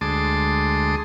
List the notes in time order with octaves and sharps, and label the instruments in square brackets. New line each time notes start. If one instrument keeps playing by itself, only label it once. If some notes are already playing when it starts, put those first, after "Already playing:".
[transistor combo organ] D2 G#3 A5 C6 D6 D#6